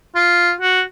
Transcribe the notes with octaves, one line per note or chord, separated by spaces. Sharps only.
F4
F#4